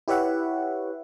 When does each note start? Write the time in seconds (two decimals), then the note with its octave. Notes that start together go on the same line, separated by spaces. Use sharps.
0.08 E4 G4 B4 C#5 E5 F#5